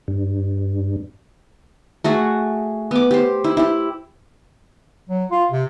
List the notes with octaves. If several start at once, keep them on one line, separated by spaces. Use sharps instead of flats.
G2
A3 F#4 G#4
B3 D6
G4 C5
E4
E4 G4
F#3
F4
C3